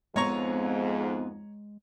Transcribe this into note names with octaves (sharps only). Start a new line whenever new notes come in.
F2 G#2 G#3 B3 C4 C#5 A#5 C#6